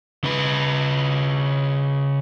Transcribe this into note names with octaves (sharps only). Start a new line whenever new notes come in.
C#3 B4